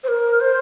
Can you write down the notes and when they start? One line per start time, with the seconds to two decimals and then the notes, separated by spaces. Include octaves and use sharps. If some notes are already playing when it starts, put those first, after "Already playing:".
0.04 C5
0.08 A#4
0.40 C5